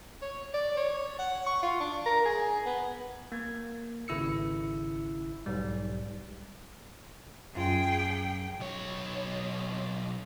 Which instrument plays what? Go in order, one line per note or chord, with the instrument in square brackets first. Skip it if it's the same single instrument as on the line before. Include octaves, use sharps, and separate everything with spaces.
[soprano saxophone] C#5
D5
C#5
F#5
C#6
F4
D4
A#4
G#4
B3
[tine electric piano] A#3 G#6
G#1 C#3 E4 E6 C#7
B1 G#2 G3
[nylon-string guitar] F#2 F4 [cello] G#4 G5
[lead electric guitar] B1 C#5